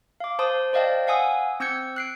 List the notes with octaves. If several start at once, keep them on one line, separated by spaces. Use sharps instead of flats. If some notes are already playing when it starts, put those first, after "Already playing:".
F5 D6
C5 A5 C6 D#6
C5 D5 D#5 F5 G5 A5
F5 F#5 G#5 D#6 E6
C4 E6 G6 G#6 C#7
F#6 C7 D7